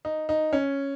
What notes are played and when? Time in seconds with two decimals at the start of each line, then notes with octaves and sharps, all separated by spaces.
0.05 D#4
0.29 D#4
0.53 C#4